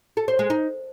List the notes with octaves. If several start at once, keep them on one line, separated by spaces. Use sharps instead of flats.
A4
C5
G#3
D#4